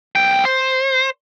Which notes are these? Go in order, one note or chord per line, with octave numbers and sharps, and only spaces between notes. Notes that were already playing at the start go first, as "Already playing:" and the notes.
B1 G5
C5